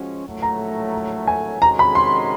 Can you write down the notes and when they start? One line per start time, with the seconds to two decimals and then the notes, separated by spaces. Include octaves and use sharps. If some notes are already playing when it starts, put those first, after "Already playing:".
Already playing: F3 G#3 C#4 F#4
0.26 A#1 A2 F#3 A3
0.42 A#5
1.27 G#5
1.61 C3 D#3 G#3 C#4 F#4 A#5
1.79 B5
1.95 C6